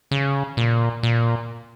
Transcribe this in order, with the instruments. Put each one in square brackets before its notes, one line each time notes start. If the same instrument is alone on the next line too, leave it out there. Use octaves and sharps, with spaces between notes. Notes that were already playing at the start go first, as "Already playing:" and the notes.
[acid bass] C#3
A#2
A#2